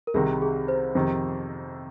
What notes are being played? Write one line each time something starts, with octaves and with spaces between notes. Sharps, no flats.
A#4
C2 C3 D#3 G#4
G#4
C5
F2 C3 D#3